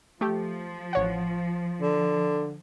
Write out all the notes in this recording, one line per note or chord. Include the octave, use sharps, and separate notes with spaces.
F3 A3 G4
A1 C#5 F#5
D3